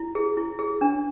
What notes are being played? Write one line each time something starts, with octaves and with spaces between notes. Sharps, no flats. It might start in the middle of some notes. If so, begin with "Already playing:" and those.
Already playing: E4
G#4
E4
G#4
D4